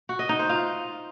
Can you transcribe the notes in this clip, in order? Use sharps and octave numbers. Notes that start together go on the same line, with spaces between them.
F#4
D#5
D#4
C5
F4